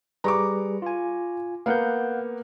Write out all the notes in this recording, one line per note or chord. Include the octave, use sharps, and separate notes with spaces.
G3 G#4 B4 A#5 C#6 D6
F4 G#5
A#3 B3 F5 F#5 G6